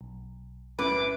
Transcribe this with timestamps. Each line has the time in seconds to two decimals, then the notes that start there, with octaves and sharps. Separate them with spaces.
0.01 B1
0.79 F#2 A2 B4 D6